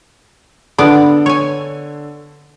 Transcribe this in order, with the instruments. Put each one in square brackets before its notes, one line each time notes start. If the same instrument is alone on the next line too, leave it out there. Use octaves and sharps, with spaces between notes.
[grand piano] D3 A4 [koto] B3 D4 D5
[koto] C#5 G#5